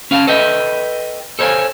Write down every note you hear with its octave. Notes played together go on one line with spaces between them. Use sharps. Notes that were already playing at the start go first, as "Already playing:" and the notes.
C#4 F5 F#5 A5
A4 B4 D#5 E5 G5
A4 C5 C#5 D#5 F5 G#5